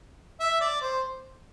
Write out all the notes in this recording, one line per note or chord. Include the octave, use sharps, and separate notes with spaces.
E5
D5
C5